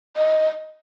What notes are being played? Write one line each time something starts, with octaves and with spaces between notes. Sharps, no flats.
D#5